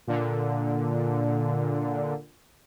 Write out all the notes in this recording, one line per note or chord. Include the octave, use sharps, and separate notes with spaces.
A#2 D3